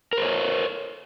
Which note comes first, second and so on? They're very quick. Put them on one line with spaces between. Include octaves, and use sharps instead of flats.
A#4 C5 C#5